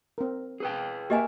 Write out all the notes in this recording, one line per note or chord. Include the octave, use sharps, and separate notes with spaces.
C4 A#4
G#4 B4 G5
A#3 G4 D#5 E5 G#5